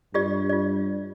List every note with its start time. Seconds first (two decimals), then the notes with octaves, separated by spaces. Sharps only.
0.14 G2 F4 G4 D5
0.49 F4 D5